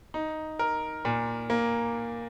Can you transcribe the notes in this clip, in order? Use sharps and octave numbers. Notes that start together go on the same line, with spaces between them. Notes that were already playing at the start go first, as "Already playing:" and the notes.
D#4
A#4
A#2
A#3